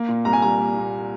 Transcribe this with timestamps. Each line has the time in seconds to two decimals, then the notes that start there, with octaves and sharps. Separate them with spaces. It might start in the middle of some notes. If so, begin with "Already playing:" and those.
Already playing: A#3
0.08 A#2
0.25 C2 A#5
0.33 G#5
0.42 G3 A#5
0.60 A#3
0.76 A#2